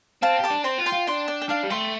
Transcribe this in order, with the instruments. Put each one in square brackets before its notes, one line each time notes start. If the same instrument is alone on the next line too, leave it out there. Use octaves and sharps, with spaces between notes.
[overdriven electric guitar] C4 [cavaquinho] F5 A5
[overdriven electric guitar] G4
[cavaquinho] A5 D6
[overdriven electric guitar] D4
[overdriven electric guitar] C4 [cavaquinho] G5 C6
[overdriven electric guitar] F4
[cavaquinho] G5 C6
[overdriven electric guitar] F4
[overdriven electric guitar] D4 [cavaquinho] G5 C6
[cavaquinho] D5 G5
G5
[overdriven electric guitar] D4 [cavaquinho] F5 A5
[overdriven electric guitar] G3
[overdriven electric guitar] A3 [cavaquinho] G5 C6